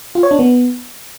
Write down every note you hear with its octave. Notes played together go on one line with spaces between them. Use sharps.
F4
C#5
D4
B3